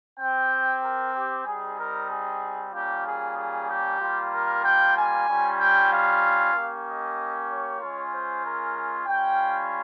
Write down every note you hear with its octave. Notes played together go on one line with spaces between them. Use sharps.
C4 G4 G5
A#4
G4
G3 C4 D#4 G#4
A#4
G#4
G3 A#3 C#4 F4 G4
G#4
G#4
G4
G3 A#3 F4
A#4
G5
G#5
G3 C#4 F4
G5
F5
A#3 C#4 G4
D#5
C#5
G#3 C#4 F4
C5
A#4
G3 C#4 F4 G5